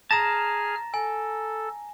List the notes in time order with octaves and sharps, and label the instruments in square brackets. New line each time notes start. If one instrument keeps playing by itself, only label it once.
[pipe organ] G#4 F6 [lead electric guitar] A5 A#5 [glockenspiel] A#6 E7
[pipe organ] A4 [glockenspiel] G#5